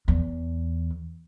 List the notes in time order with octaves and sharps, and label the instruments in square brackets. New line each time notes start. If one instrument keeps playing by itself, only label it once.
[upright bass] E2